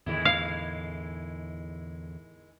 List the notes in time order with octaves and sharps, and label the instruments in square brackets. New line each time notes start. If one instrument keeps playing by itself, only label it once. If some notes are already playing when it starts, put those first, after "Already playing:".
[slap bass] E2 A2 D3 [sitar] D#3 G#3 E4
[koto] F5